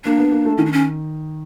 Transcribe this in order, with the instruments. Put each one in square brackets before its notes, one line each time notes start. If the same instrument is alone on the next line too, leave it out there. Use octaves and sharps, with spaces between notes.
[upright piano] A#3 [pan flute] D4
[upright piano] B3
A#3
A3
[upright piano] D#3 [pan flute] C#4
[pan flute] D4
C#4